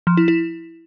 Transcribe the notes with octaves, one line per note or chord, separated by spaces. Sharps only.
F3
E4
E4